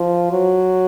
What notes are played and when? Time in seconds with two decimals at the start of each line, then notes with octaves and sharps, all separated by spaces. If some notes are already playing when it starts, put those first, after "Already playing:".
Already playing: F3
0.32 F#3